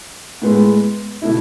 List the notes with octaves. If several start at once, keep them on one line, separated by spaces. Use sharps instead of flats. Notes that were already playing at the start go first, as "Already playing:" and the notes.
A2 G#3 B3
B2 A3 E4